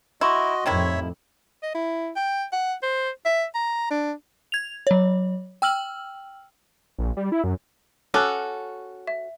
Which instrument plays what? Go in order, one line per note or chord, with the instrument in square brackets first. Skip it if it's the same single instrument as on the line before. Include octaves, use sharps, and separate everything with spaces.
[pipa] E4 [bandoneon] F#4 D#5 [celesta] C6 C#6
[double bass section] F2 A2 [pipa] C3 D#3 E4 [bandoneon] C#5 E5
[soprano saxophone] D#5
E4
G5
F#5
C5
E5
A#5
D4
[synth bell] G#6 F7
F#3 C#5
G5 E6 F6 F#7
[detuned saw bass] A#1
G3
E4
F#2
[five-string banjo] C#4 F#4 A4 [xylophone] D6 F6 F#6
[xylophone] E5